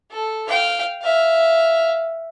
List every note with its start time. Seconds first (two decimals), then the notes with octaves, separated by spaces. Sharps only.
0.11 A4
0.48 F5 G5
1.02 E5 F5